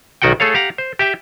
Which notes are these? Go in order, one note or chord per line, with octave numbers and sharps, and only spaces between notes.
B1 D#3 F#4 F#5 G5
A3 G#4 A4 C#5 F5
G4 F5 F#5 A#5
C5
G4 E5 G5